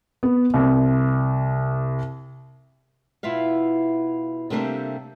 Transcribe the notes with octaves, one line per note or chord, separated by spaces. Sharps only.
B3
C2
B2 E4 F4 E5 F5
C3 G3 A3 A#3 C4 D4